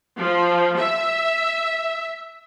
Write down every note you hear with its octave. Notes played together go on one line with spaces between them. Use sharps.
F3
E5